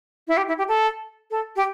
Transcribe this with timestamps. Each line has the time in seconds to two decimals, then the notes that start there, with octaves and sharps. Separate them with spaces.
0.28 E4
0.37 G4
0.48 E4
0.58 G4
0.68 A4
1.31 A4
1.56 G4